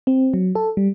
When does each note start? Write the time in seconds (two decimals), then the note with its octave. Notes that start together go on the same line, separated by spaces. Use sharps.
0.07 C4
0.34 F#3
0.55 A4
0.77 G3